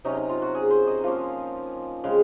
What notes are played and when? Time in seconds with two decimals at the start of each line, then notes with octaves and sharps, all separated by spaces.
0.05 C3 F#3 C#4 D#4
0.17 D#4
0.29 F4
0.42 F#4
0.55 G#4
0.71 C5
0.87 D#5
1.04 F3 A#3 C#4 F5
2.04 C#3 G#3 C4 F5